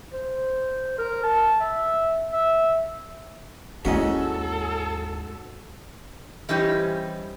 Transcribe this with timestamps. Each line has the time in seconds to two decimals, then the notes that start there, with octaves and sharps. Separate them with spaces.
0.13 C5
0.98 A#4
1.23 A5
1.60 E5
2.32 E5
3.85 D#2 G#2 C#4 E4 F#4 A4 D#5
6.49 E3 G3 C#4 D#4 G4 C5